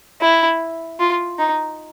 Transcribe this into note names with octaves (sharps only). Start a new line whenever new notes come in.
E4
F4
D#4